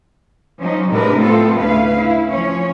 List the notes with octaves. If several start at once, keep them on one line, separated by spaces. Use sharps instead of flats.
F3 F#3 C#4 D#4
A2 C3 G#3 D4 A#4 B4
A3 B3 C4 F4 A4
D2 C#3 E4 B4 F5
E4
F3 C#4 C#5